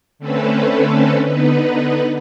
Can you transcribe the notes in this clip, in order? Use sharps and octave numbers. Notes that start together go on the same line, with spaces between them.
D3 A3 C4 C#4 A4 B4
D3 B3 D#4 B4